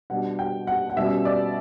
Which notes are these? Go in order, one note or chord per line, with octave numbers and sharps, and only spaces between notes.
B2 G3 D4 F#5
G5
F#5
F#5
B2 G3 C#4 E5
D5